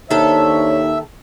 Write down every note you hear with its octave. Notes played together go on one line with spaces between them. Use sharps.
D#2 D#3 D4 A4 C5 C#5 E5